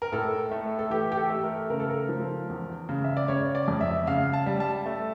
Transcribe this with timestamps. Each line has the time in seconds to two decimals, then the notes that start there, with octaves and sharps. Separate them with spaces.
0.02 A#4
0.12 A2 A4
0.51 A3
0.79 A4
0.90 E3 G4
1.12 G4
1.17 A4
1.30 A3
1.43 A#4
1.70 C#3 A#4
1.80 A4
1.90 A#4
2.09 F3
2.49 E2
2.89 C#3
3.04 E5
3.17 D5
3.28 C#3 C#5
3.55 D5
3.68 F2
3.81 E5
4.07 C#3 F5
4.33 A5
4.46 G3
4.60 A5
4.86 A3